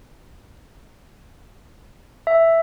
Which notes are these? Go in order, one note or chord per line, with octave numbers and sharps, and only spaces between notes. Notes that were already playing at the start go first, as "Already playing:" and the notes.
E5